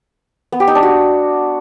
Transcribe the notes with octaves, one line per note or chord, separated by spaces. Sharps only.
B3
G4
D#4
D4
F#4